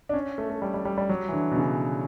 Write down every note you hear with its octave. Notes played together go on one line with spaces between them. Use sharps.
D4
C#4
A3
A3
G3
G3
G3
G3
F#3
E3
D3
B2
C#3